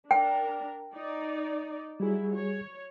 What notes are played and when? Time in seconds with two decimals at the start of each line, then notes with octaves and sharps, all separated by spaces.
0.11 D4 A#4 G5
0.93 D#4 D5
2.00 F#3 G3 E4 G#4
2.33 C#5